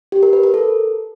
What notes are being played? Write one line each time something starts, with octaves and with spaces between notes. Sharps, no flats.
G4
A#4
B4
A#4
A4